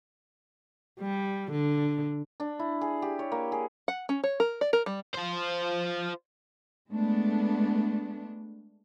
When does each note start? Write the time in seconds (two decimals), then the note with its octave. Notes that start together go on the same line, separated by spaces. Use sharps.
1.00 G3
1.51 D3
2.40 D4
2.59 E4
2.81 G#4
3.02 G4
3.19 C#5
3.32 A#3
3.52 G#4
3.88 F#5
4.09 C#4
4.24 C#5
4.40 A#4
4.61 D5
4.73 A#4
4.86 G3
5.14 F4 C5
6.90 G#3 A3 B3 D4